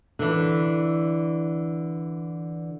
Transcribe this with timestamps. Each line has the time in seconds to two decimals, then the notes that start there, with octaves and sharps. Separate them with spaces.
0.19 D3 E3